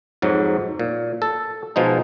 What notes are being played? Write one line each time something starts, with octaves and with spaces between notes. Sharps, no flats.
F2 G#2 F#3
A#2
A4
B2 F3 G#3 D#4